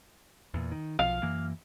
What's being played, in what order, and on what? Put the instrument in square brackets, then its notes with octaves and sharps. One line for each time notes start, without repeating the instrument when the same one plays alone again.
[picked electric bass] E2 A#2
D#3
[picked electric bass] B1 F3 [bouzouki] F5
[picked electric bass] F#2 E3 A#3